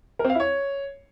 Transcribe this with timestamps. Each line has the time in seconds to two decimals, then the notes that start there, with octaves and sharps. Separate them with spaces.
0.19 A#4
0.24 C4
0.30 F5
0.35 E4
0.40 C#5